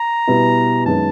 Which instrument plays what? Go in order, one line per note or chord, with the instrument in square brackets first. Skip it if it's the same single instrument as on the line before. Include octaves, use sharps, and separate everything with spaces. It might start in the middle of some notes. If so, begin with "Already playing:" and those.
Already playing: [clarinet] A#5
[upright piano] B2 G3 B3 E4
[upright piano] F#2 D#3 G#3 B3 [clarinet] A5